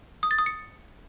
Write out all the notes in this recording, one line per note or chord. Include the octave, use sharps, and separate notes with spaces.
D#6
A6
D#6
C#7